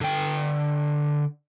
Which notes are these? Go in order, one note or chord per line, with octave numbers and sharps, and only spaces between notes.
D3 G5